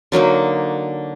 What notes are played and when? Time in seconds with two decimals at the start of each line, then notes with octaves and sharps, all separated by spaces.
0.12 D3 F#3 A#3 D#4